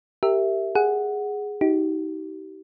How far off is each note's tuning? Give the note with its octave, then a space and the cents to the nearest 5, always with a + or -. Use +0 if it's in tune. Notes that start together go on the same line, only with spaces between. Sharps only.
G4 -5 A#4 -25 E5 +0
G#4 +0 F#5 +0
D#4 +25 G4 -35